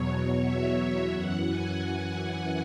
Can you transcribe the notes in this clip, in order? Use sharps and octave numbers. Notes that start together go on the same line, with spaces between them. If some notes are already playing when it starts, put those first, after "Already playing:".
Already playing: E2 B2 F#3 C#5
E5
F#2 E3 F#5
G#5
F#5